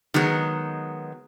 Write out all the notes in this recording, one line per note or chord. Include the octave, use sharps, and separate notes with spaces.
D#3 F#3 G#3 B3